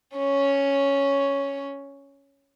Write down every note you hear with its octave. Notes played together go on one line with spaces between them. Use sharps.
C#4 C#5